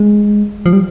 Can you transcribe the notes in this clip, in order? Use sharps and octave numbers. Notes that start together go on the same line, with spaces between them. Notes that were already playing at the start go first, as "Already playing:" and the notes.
Already playing: G#3
F3
G3